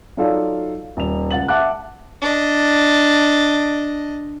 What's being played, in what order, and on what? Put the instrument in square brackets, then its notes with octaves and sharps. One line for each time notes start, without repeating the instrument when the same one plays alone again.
[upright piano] F#3 D#4 F4 A4 D5 F5
D#1 F7
C#2 F#5 A6 F#7
E5 F#5 A5 D6 F#6
[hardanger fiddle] D4 D#5